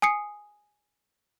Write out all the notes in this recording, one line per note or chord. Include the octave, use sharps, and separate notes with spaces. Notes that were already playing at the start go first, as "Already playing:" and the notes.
G#5 D#6 C7 C#7